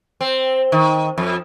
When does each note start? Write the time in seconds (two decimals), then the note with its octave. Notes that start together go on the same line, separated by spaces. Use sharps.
0.21 C4
0.72 D#3
1.18 F2